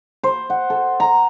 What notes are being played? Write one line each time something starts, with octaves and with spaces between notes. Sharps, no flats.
C5
F#5
A4
A#5